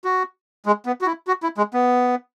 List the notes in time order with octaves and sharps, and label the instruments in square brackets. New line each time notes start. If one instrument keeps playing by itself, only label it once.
[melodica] F#4
G#3
B3
F#4
E4
F#4
E4
G#3
B3